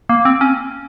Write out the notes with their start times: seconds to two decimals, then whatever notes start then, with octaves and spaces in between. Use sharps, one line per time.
0.09 A#3
0.25 C4
0.41 C#4